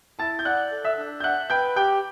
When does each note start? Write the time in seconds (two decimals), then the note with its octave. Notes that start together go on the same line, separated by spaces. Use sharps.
0.19 E4 A5 A6
0.39 G6
0.45 D5 F#5 F#6
0.72 A4
0.84 E5 E6
0.97 D4
1.20 G6
1.24 E5 F#5 F#6
1.50 B4 G5 G6
1.76 G4 G5 G6